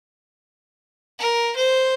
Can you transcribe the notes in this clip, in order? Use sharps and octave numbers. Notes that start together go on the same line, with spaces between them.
A#4
C5